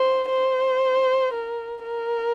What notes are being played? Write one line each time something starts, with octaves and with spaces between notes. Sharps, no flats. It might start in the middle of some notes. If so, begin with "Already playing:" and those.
Already playing: C5
C5
A#4
A#4